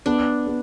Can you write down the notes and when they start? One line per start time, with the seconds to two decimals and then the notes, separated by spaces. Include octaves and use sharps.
0.06 B3 D4
0.47 B3